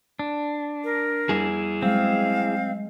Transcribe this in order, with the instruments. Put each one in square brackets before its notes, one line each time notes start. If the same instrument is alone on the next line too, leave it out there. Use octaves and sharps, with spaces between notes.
[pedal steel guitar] D4
[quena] A#4
[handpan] G3 [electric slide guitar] E4 G#4
[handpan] F#3 G#3 [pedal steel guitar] C4 [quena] F5